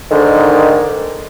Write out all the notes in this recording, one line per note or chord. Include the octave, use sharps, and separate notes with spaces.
G#2 D3 D#3